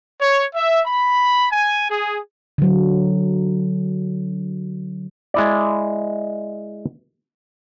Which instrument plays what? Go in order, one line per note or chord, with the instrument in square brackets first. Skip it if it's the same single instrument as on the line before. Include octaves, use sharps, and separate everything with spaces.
[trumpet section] C#5
E5
B5
G#5
G#4
[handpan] D3 F#3
[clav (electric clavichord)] G#3 E4 D5